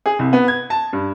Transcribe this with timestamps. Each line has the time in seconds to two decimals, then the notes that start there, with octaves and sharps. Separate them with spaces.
0.06 G#4
0.19 C2
0.33 B3
0.48 G#6
0.70 A5
0.93 G2